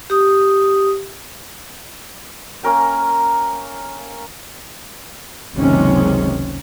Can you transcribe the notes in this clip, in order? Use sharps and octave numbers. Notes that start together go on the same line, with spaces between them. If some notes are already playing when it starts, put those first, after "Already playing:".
G4 D#6
A#3 C#4 A#4 G5
F#1 C#2 C3 D#3 G#3 C#4